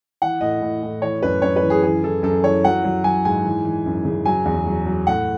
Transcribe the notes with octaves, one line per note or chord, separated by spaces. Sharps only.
E3 F#5
A2 D#5
A2
A2
E3 C#5
F#2 B4
F#2 C#5
B4
E3
G#4
E3 G#4
E3 A4
F#2 A4
E3 C#5
F#3 F#5
F#3
F#3 G#5
G#2 G#5
E3
E3
F#2
C#3
F#3 G#5
E2
F#3
F#3
A2 F#5